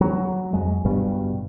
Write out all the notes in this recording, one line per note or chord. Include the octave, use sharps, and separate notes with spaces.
F#3
F2 F#3 G#3
G1 G2 B2 G3